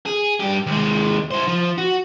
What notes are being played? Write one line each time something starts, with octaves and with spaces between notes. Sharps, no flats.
G#4
G2 G4
D#2 G#3
E4 C5
F3
F#4